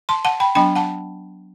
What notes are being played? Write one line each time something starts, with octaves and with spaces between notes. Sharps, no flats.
A5 C6
F#5 A5
G5 B5
F#3 B3 D4 G5 B5
F#5 A5